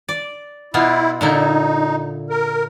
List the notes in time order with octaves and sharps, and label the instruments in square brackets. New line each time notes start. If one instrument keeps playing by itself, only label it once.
[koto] D5
[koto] B2 B3 F4 [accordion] E4
[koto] A#2 D3 E4 [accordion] D#4
[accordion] A#4